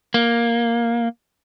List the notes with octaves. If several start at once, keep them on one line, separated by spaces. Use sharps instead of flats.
A#3